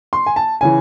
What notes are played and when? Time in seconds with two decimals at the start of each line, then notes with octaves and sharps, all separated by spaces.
0.13 C6
0.26 G#5
0.36 A5
0.61 C#3 E3 G#5